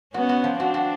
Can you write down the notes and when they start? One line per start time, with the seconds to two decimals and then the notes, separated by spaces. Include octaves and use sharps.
0.14 B3 C#4 F#4
0.29 F#4
0.44 F3
0.60 C4 D4 F#4
0.74 F#4